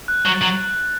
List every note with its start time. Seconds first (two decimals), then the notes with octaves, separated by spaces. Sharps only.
0.08 F#6
0.25 F#3
0.33 A6
0.42 F#3